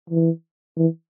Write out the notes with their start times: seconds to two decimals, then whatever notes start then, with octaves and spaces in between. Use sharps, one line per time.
0.10 E3
0.77 E3